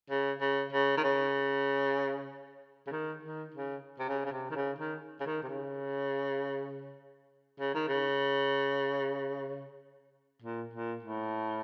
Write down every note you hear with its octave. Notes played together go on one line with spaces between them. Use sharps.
C#3
C#3
C#3
D#3
C#3
C#3
D#3
D#3
C#3
C3
C#3
C#3
C3
D#3
C#3
D#3
C#3
D#3
C3
C#3
C#3
D#3
C#3
A#2
A#2
A2